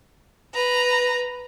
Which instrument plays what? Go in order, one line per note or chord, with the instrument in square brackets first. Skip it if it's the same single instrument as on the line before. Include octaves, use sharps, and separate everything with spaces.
[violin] B4 A#5